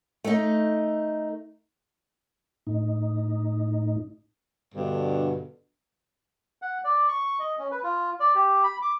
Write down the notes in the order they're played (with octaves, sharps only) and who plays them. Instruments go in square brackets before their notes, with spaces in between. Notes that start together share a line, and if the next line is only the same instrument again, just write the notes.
[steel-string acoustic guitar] A3 D#4
[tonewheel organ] A2 D#4
[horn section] G2 B2 D3
[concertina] F#5
D5
C#6
D#5
C#4
B4
F4
D5
G4
B5
D6